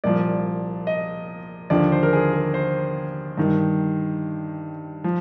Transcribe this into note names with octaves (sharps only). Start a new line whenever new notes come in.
C2 A#2 F3 D5
D#5
D#2 D3 F3 D5
C5
A#4
G#4
A#4
C5
G2 D#3
F3